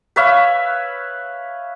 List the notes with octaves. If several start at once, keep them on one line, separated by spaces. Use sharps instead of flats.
B4 C#5 E5 F5